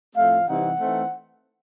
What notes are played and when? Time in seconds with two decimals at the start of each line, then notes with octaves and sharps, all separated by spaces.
0.15 A2 F3 A3 C4 F5
0.46 C3 E3 G3 C4 D#4 F#5
0.79 E3 A3 C4 D#4